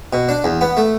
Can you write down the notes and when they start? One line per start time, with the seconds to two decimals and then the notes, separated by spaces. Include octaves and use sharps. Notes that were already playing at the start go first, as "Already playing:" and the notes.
0.13 B2
0.29 D4
0.44 E2
0.61 B3
0.77 A3